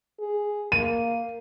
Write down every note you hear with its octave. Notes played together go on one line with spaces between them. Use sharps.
G#4
A#3 D#7